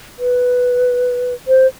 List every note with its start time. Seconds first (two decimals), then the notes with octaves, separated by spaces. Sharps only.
0.19 B4
1.48 C5